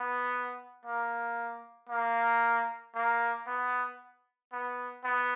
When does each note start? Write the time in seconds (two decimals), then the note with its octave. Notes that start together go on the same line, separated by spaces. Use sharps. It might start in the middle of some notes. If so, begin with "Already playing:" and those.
Already playing: B3
0.85 A#3
1.89 A#3
2.95 A#3
3.47 B3
4.52 B3
5.04 B3